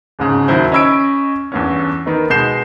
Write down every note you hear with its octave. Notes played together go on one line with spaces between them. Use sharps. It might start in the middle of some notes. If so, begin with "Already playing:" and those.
D1 G#2 C#3
D#2 D#3 F#3 E4 C5
C#4 D#5 B5 E6 G#6 D7
E2 G2 C#4
D#3 B3 D#4
B2 G#3 G6 C7 E7